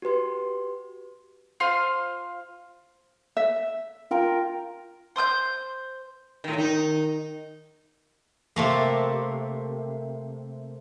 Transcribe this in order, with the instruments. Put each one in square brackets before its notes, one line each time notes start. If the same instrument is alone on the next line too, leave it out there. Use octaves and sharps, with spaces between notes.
[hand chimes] F#4 G4 B4 C6
[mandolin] F4 C5 F5 C6
[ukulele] E5
[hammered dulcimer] F4 A#4 G5
[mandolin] C5 C6 D#6 G6
[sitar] A2 D#3
[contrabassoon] D#3 [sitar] D#4
[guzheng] C3 A3 A#3